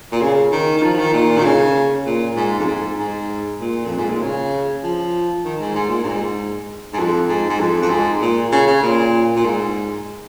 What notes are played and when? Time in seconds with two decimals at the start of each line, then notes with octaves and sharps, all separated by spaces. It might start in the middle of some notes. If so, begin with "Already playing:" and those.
0.12 A#2
0.21 C#3
0.52 D#3
0.78 D#3
0.82 F3
0.94 F3
0.99 D#3
1.13 A#2
1.38 D#3
1.44 C#3
2.06 A#2
2.36 G#2
2.59 F2
2.67 G#2
2.99 G#2
3.60 A#2
3.85 F2
3.97 G#2
4.09 A#2
4.21 C#3
4.83 F3
5.44 D#3
5.60 G#2
5.75 G#2
5.89 A#2
6.03 G#2
6.93 G#2
6.99 F2
7.28 G#2
7.49 G#2
7.60 F2
7.82 F2
7.90 G#2
8.21 A#2
8.52 C#3
8.67 C#3
8.83 A#2
9.36 A#2
9.45 G#2